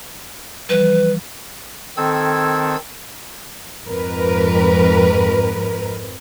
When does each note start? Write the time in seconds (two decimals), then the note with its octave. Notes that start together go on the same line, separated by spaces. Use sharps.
0.69 E3 F3 G3 B4
1.97 D#3 C4 A4 E6 G#6
3.87 F2 G#2 A#4 B4